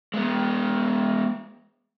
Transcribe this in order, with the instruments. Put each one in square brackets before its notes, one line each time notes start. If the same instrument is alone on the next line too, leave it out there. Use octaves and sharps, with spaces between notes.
[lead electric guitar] G#3 B3